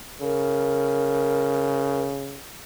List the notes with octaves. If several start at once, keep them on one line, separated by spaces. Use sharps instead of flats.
C#3 A#4